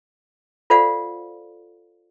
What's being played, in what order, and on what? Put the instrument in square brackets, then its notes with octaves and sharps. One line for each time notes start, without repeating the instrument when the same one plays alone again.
[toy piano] F4 A4 C5 D5 F5 F#5